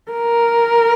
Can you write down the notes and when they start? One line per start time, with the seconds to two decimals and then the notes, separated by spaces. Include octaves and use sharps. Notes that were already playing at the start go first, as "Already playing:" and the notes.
0.12 A#4